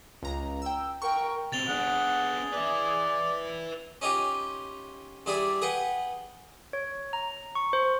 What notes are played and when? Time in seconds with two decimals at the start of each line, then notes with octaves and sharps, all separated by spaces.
0.23 C#2 A#5
0.62 G5 E6
1.02 A#4 G5 C#6
1.52 B2 C4 A6 F7 G7
1.69 B3 D4 G#4 F#5
2.53 B4 D5 E5
4.01 C#4 D#4 F4 G4
5.26 G2 E4 G#4 D5
5.62 G#4 B4 F#5 G5
6.73 C#5
7.13 A#5
7.55 C#6
7.73 C5